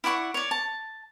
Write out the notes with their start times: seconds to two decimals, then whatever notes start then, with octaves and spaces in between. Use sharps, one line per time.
0.04 E4 D5 F#5 C#6
0.34 C#5 D5
0.51 A5